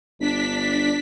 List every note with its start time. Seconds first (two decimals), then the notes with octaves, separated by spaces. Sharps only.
0.20 G1 D4 B6